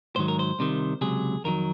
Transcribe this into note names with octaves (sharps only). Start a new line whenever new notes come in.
G#2 D#3 F#3 C5
A#4
C5
C2 C3 D#3
C#2 C3 F#3 G#4
F2 D#3 F#3 A#4